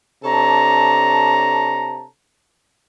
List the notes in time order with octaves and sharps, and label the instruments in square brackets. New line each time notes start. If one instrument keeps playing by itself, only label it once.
[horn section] C3 D4 A4 C#5 A5 A#5